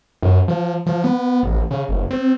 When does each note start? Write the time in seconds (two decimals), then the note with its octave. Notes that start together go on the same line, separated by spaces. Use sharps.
0.23 F#2
0.48 F3
0.86 F3
1.04 B3
1.43 A1
1.71 C#3
1.89 F#1
2.11 C4